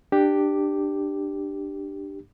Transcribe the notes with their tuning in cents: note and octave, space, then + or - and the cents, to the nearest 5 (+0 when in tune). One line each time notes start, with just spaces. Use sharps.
D4 +20 G4 +0